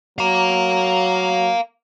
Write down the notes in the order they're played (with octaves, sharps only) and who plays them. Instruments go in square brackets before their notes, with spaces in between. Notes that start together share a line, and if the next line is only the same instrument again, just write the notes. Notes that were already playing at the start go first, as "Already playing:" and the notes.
[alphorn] F#3 [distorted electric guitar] F5 A#5